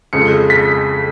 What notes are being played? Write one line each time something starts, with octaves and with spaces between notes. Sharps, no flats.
F2 C#3 G#3 C#7
B6